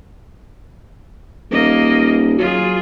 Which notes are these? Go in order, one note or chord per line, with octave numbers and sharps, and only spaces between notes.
D#1 A#3 D#5
F#3 F4 G#4